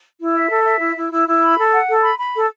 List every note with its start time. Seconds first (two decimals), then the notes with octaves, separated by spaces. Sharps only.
0.20 E4
0.34 E5
0.50 A4
0.65 E5
0.80 E4
0.96 E4
1.11 E4
1.27 E4
1.42 B5
1.58 A4
1.73 F#5
1.89 A4
2.04 B5
2.19 B5
2.35 A4